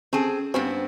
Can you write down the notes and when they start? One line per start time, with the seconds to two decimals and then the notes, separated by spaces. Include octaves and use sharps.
0.13 C4 C#4 G4 G#4 A5
0.54 G2 B3 C4 G4 C5 G#5